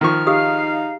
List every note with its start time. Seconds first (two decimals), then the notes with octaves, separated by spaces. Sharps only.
0.01 D#3 F3 C#6 F6
0.27 D#4 G4 G#4 F5 D#6